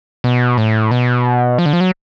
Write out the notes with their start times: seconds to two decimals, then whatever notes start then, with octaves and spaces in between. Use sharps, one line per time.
0.24 B2
0.58 A2
0.91 B2
1.58 F3
1.66 D3
1.73 F3
1.81 F#3